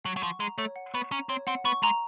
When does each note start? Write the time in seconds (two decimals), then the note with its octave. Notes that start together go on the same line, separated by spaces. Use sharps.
0.05 F#3 F#5
0.17 F#3
0.23 F3 C#6
0.40 G#3 A#5
0.58 A3 C#5
0.76 F#5
0.94 B3 C#6
1.12 C#4 A#5
1.29 C4 C#5
1.47 C4 F#5
1.65 B3 C#6
1.83 G#3 A#5